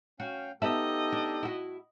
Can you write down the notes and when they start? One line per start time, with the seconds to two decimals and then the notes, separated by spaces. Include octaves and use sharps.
0.20 C#4 F#4 F5 G5
0.62 B3 D#4 G4 A4 D#5 E5 A5
1.12 D4
1.43 E4 F#4